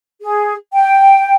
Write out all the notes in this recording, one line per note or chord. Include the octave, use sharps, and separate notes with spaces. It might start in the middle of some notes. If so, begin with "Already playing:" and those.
G#4
G5